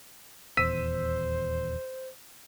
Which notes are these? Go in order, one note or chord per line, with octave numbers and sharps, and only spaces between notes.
D#1 E2 C5 E6 B6 D#7